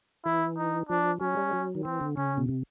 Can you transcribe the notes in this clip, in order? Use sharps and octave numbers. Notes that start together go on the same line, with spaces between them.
E3 E4
D#4
F3 D4
F#3 C#4
G3
F#3
D#3
E3 C4
D3
C#3 C#4
B2
C3